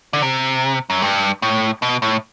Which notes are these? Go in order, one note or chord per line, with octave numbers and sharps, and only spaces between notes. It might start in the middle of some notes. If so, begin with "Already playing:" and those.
D3
C3
F#2
G2
A2
B2
A2